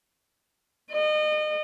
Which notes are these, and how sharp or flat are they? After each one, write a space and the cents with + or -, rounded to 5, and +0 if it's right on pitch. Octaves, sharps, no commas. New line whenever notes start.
D#5 -35